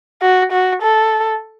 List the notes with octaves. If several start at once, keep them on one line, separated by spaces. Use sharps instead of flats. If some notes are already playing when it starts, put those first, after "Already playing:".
F#4
F#4
A4